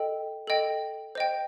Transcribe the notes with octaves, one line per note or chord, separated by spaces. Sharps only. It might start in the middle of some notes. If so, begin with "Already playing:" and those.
Already playing: A4 D#5 G5
A4 D#5 G5
C5 D#5 G5